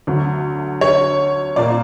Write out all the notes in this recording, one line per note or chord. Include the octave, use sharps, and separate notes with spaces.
D2 D3 F#3
C#5
A#1 A#2 A#3 D5